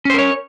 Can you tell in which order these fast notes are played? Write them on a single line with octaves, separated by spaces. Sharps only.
C#4 C5 A#4 C#5